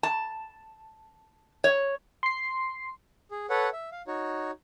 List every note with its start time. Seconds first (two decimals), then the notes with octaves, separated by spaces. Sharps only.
0.03 A5
1.64 C#5
2.23 C6 C7
3.31 G#4
3.50 A4 B4 C#5 F#5
3.73 E5
3.92 F5
4.07 D#4 F#4 C#5